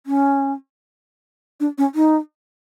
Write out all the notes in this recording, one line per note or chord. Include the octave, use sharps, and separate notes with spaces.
C#4
D4
C#4
D#4